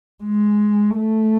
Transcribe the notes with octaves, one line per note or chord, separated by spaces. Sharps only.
G#3
A3